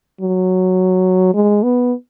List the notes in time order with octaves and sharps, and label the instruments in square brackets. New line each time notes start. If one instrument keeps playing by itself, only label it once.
[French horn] F#3
G#3
B3